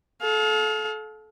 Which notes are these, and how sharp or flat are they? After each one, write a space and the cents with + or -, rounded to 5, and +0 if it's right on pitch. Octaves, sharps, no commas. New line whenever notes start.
A4 -30 F5 +30